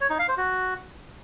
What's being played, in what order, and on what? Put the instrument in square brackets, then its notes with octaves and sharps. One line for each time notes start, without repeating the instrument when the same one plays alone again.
[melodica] C#5
D#4
F5
C5
F#4